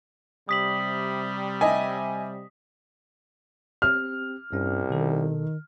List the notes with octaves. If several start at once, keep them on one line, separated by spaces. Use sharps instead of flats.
C3 G3 D#6 B6 F#7
D#5 E5 G#5
C4 G4 F6
C2 G2 C#4
B2 D#3 A4